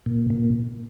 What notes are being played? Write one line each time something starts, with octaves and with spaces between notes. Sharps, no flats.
A#2
A#2